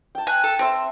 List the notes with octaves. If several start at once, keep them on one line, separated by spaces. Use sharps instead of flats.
G5 A5
G#5 F#6
A4
C4 C5 E5 E6